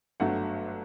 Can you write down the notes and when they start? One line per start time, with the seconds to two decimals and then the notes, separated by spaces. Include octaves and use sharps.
0.20 G1 G2 F#3 A3 F#5